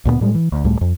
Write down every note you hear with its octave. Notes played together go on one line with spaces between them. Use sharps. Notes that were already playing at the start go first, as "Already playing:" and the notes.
D2 A#2 G3 B3
A2 G3 G#3
E3
D2
C#2 A2 G3 A3
F2